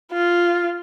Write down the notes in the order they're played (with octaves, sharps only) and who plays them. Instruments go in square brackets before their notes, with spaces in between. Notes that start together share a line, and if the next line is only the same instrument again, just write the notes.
[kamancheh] F4